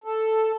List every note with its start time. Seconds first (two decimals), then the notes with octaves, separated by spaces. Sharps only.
0.04 A4